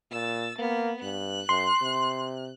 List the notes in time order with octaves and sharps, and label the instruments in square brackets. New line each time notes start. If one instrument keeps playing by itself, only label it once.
[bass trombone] A#2 [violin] E6 A6
[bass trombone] A#3 [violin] B3
[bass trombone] G2 [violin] F#6
[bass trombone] F#2 [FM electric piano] C6
[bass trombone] C3